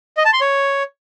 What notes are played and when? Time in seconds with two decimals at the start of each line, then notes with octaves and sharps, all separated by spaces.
0.17 D#5
0.25 A5
0.33 C6
0.41 C#5